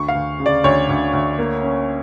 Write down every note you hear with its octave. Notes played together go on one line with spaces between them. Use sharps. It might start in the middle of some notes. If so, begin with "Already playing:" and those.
Already playing: D2 C#6
F5
D2
C#3
D5
D2 C#5
D2
D2
A#3
C#4